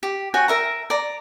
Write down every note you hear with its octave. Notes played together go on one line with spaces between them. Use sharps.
G4
F#4 C#5 G5 G#5
A#4 E5 A#5
D5 A#5